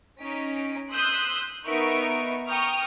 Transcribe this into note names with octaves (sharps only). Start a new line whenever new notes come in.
C#4 D#4 B6 D7
C6 D#6 E6 F#6 G6 B6
B3 D#4 A#4 E5 C#6 D7
G5 A#5 C#6 D#6 F6